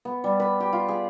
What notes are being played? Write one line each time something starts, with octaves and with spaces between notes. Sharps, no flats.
B3
G3
B4
G4
F4
G#4